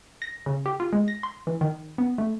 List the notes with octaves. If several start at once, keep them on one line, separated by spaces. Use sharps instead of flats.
A#6
C#3
G4
F4
G#3
A#6
C6
E3
D#3
B3
A3